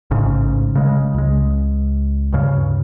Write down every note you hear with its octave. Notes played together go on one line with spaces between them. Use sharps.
A1 G#2 C#3
C#3 G#3
C#2 G#3
D2 G2 C#3